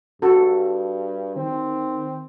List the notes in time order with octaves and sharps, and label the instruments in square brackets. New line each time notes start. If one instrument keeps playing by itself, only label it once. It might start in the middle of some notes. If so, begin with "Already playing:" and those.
[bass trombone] G2 [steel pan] F#4 A4
[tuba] D#3 [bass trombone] C4